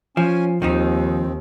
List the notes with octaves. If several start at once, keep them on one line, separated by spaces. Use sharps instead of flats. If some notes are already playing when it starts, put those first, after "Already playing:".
F3 C#4 G#5
D#2 D#3 F3 C4 D#4